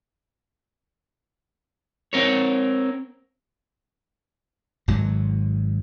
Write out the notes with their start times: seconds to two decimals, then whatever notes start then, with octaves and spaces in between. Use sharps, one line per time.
2.13 C4 A#4 C#5
4.88 G#1 G#2 F#3